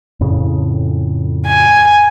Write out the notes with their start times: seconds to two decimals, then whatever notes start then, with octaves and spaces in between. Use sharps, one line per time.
0.21 F2 A2 C#3
1.47 G#5